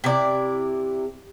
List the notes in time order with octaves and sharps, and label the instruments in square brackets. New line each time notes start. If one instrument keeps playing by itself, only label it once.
[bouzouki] C3 E4 D5